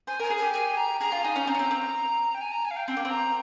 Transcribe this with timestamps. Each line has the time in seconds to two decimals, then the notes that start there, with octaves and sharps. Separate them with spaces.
0.07 C5 G#5
0.19 A#4 G#5
0.30 G#4
0.38 G4 G#5
0.53 G#5
0.77 A#5
1.01 G#4 A#5
1.12 F4
1.23 D#4 G#5
1.36 C#4
1.47 C4 A#5
1.55 C#4
1.59 C4
1.71 C4
2.35 G5
2.41 G#5
2.52 A#5
2.65 G#5
2.71 F5
2.76 G5
2.88 C4 G5
2.97 A#3
3.05 C4
3.11 A#5